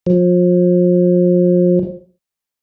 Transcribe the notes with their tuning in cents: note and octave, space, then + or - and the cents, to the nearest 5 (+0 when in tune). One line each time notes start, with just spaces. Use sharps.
F3 +35